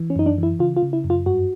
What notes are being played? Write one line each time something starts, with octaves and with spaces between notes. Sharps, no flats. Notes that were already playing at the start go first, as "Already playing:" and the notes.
Already playing: E3
C#4
F#2 D#4
D4
E3 E4
C#3 F4
F4
C#3
E4
F#2
F4
G2 F#4